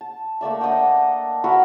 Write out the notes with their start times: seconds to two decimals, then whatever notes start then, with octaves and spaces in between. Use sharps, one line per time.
0.01 A5
0.41 A3 A#3 D5 E5
0.61 D4 D#5 F#5 G5
1.44 F#4 A#4 B4 E5